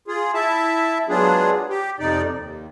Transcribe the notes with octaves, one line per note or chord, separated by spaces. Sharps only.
F4 G#4
E4 E5 A5
F#3 G#3 B3 D4 F4 G#4
G4
F2 C3 D#4 D5
D#2